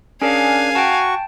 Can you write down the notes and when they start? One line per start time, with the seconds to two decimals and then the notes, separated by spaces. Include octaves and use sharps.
0.22 C#4 D4 G#4 A#4 F5 G#5
0.75 F#4 G5 A5 C#6